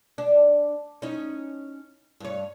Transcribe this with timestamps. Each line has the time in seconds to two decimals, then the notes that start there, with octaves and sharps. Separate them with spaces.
0.18 D4
1.02 C#4 D#4
2.20 G2 C#5